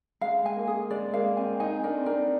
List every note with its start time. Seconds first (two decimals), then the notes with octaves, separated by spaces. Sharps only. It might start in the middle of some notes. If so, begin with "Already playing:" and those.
0.21 G#3 F5
0.46 G#5
0.57 A#3
0.67 G#4
0.90 G#3 D5
1.14 A#3 F5
1.37 C4 G#5
1.60 D#4 G#5
1.83 D4 A#4
1.98 C4
2.06 D4 A#4